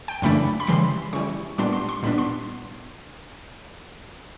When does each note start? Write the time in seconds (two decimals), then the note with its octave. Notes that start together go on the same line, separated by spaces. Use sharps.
0.08 G5
0.22 F#2 C#3 E3 A3 D4 B5
0.60 B5
0.67 C#3 E3 G3 C6
1.13 C#3 E3 G3 C#6
1.58 A#2 G3 B3 D4 C6
1.73 C6
1.89 C6
2.03 A#2 G3 B3 D4 B5
2.18 C6